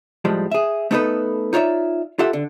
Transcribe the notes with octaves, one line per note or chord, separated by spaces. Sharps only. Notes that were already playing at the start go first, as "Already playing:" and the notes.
A2 F3 G3 G#3
G#4 E5
A3 B3 D#4 G#4 A4 B4
D#4 F4 C#5 D5 E5
F4 G4 A4 E5 F#5
D3